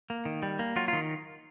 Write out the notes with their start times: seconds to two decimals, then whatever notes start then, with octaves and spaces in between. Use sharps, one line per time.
0.10 A#3
0.25 D#3
0.43 G3
0.59 A#3
0.76 F#3 F4
0.88 D#3 F4